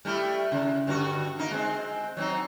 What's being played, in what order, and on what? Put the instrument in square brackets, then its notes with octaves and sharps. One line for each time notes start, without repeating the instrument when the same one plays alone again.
[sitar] G3 A3 E4
C#3
G2 D3 F#4
A#3 D#4
G#3 C4
F#3 C4 D#4